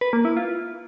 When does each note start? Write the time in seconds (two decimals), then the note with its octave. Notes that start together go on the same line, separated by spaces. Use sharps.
0.01 B4
0.13 A#3
0.25 E4
0.37 F4